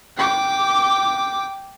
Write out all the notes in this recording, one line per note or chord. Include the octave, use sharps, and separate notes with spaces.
G5 D6